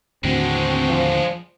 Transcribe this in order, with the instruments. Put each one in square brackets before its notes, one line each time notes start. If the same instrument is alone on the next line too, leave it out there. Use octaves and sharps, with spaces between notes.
[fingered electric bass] D#2 A2 D3 [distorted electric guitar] G#3 D4 [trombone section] C4 F#4
[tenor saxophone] F3